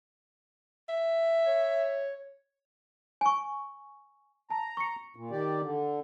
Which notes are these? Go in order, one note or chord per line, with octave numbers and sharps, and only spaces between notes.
E5
C#5
G#5 C#6
A5 A#5
C#6 C#7
A#2
D#3 G4 D5
D3